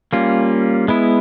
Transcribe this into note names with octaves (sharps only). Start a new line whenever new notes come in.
G3 A#3 C#4 F4
G#3 B3 E4